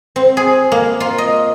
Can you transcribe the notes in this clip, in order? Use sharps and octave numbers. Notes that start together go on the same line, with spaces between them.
C4
G#4
A#3
F4
D#5